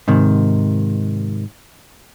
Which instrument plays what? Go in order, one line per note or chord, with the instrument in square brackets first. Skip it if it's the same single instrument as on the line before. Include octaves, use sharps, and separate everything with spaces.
[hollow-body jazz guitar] G#2 C3 D#3